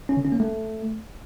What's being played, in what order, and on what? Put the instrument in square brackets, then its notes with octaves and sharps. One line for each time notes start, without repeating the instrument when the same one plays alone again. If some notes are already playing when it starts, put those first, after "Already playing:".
[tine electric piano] C#4
D3
C#4
A#3
A3